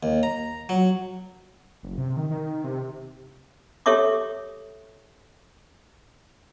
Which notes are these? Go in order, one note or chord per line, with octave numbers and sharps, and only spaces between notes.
D#2
A#5
F#3
F#1
C3
D#3
D#3
C3
G4 A4 C#5 E5 C#6 D6